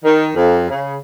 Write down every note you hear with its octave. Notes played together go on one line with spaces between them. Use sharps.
D#3
F2
C#3